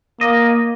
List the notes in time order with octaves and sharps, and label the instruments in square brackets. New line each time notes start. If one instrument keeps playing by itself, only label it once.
[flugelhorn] A#3 [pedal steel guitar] D#5